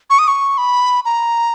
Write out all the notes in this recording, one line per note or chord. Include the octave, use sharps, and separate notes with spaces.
C#6
D#6
C#6
B5
A#5